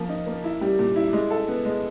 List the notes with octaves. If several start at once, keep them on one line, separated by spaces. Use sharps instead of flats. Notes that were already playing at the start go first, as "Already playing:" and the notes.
Already playing: F3 A#3
D#4
A#3
E4
G3
A#2
E4
G#3
A4
B3
G#3